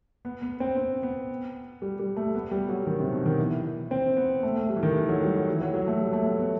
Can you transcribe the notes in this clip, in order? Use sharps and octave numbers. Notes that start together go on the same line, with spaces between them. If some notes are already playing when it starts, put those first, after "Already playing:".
B3
B3
C4
C4
B3
G3
G3
A3
B3
G3
F#3
D#3
C3
B2
D#3
E3
C4
B3
A3
A3
G3
E3
D#3
E3
F#3
G3
F#3
E3
F#3
F#3
A3
G3
A3
B3
B3